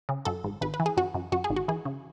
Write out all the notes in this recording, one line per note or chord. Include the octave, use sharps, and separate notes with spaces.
C#3
F#2 A4
G#1
G#1 B4
B4
E3
G#4
F#2 F#4
F#2
F#2 F#4
G#4
G#1
F#4
E3 G#4
C#3